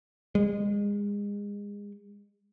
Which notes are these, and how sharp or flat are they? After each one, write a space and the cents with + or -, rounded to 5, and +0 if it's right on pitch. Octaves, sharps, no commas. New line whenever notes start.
G#3 -30